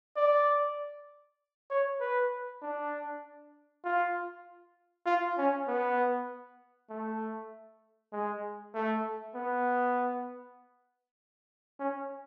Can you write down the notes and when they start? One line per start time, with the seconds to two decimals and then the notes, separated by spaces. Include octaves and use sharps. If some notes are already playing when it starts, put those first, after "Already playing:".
0.17 D5
1.70 C#5
2.01 B4
2.62 D4
3.85 F4
5.06 F4
5.38 C#4
5.68 B3
6.90 A3
8.13 G#3
8.75 A3
9.35 B3
11.79 C#4